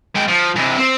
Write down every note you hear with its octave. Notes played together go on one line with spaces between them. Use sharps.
G#3 G5
F3
C3 E3
C4